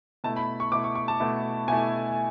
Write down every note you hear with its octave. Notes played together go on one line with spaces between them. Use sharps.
B2 A3 E4 A5
B5
C#6
B2 A3 E4 D6
C#6
C#6
A5
B2 A3 E4
B2 A3 E4 G#5